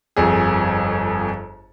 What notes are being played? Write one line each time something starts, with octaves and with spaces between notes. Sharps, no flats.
G1 F2 G#4